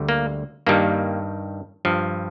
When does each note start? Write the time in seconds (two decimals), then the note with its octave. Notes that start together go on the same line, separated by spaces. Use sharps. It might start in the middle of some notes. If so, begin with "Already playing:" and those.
Already playing: D2 D3 G3
0.09 A#3
0.67 G2 D#3 G3 A#3
1.85 G2 F3